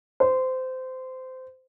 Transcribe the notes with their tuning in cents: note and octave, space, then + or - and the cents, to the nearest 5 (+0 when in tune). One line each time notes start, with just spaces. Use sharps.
C5 -20